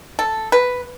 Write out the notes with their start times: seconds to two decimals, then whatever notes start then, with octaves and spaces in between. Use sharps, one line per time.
0.19 A4
0.52 B4